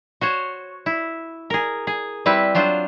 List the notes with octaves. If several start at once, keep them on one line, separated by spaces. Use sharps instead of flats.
F#4 C5 C#5
E4
G#4 A#4
G#4
G3 C4 E4 B4
F#3 D4 F4 C5